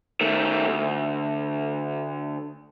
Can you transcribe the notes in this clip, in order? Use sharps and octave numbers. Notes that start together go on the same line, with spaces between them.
D#3 A3
D2